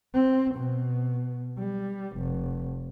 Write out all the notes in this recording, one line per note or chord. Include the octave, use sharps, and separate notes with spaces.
C4
B2
G3
F1